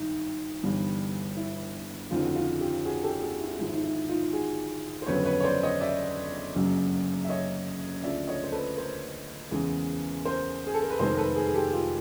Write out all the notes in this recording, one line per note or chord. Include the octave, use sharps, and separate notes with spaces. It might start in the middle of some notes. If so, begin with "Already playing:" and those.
Already playing: G#1 G2 D#4
G1 G2 E3 G3
E4
G1 F2 C#3 D#4 F4
F#4
D#4 F4
F4 G4
F#4 G#4
G4 A4
F#4 G#4
E4 F#4
G#1 G#2 F3 G#3 E4
D#4
E4
D#4 F4
F#4 G#4
C5
G1 F2 C#3 F#3 B4 C#5
B4 C#5
C#5
C5 D5
C#5 D#5
D5 E5
F#1 F#2 C#3 F#3
E5
C#5 D#5
D2 C#3 F3 D5 E5
C#5 D#5
C5
A4 B4
A#4 C5
E2 C#3 E3 G#3
A#4 C5
G#4
A4
A#4
B4
F1 F2 C3 D#3 G#3 A#4 C5
A#4
A4 B4
G#4 A#4
G#4
G4 A4
F4 G4